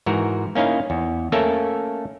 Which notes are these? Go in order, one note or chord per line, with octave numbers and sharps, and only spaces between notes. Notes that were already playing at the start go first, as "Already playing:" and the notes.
G#2 E3 F#4 A#4
A#3 C#4 D#4 E4 F5
E2
A3 A#3 C#4 A4 A#4 E5